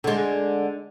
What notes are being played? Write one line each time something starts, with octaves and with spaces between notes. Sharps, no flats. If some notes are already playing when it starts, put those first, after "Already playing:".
D3 G#3